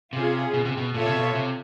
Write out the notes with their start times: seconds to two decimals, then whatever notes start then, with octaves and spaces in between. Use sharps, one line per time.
0.13 C3 C#4 F4 G#4
0.54 B2
0.65 C3
0.77 B2
0.94 A#2 F4 A4 C#5 E5
1.06 C3
1.15 B2
1.35 C3